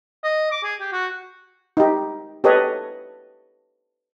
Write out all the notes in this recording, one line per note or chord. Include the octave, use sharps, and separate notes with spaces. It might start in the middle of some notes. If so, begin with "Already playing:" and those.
D#5
D6
G#4
G4
F#4
D#4 G4
G4 A4 B4 C#5 D#5